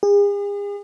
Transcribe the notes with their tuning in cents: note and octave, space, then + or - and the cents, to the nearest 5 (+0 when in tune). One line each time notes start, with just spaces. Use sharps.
G#4 -40